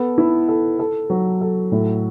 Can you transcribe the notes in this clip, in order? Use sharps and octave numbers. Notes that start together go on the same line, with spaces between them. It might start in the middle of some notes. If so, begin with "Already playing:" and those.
Already playing: B3 A4
E4
A4
A4
F#3
A4
A2